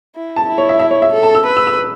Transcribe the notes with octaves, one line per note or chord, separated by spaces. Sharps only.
E4
A5
E4
C#5
E5
E5
C#5
E5
A4
A5
E6
B4
E6
E6